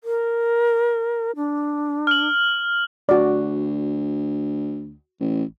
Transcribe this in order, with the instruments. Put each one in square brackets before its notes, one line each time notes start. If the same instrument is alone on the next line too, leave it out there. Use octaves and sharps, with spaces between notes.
[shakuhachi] A#4
D4
[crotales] F6 F#7
[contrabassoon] D2 [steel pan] F#4 D5
[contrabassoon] A1